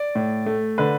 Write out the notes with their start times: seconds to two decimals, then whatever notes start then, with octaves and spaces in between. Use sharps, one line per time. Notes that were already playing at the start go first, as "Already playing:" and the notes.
Already playing: D5
0.15 A2
0.46 A3
0.78 D3 B4